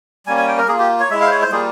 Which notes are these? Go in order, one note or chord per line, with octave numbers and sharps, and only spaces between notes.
G3 A#3 C#4 G#5
G#5
G5
A#4
A#3 F4 G#4
G4
C#5
G#3 E4 E5
F5
C5
C#5
C5
G3 A#3 F4 G#4